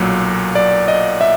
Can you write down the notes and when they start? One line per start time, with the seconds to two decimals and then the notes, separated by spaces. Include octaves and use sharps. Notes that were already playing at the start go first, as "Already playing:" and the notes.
Already playing: B1 A#2 F#3
0.55 D5
0.88 D#5
1.21 E5